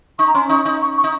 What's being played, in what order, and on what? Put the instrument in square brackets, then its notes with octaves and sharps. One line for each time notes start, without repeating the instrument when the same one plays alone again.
[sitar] D#4 [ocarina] C#6
[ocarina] A#5
[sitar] C#4 [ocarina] C6
[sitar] D#4 [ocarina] C#6
[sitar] D#4
[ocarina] C#6
C#6
[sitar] D#4